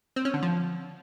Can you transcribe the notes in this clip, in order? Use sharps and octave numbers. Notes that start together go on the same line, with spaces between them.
C4
C#4
D3
F3